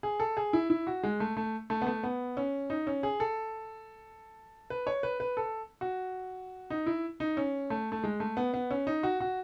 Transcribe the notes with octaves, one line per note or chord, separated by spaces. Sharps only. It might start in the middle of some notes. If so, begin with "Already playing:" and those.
G#4
A4
G#4
E4
E4
F#4
G#3
A3
A3
A3
B3
A3
B3
C#4
D#4
C#4
G#4
A4
B4
C#5
B4
B4
A4
F#4
D#4
E4
D#4
C#4
A3
A3
G#3
A3
B3
B3
C#4
D#4
F#4
F#4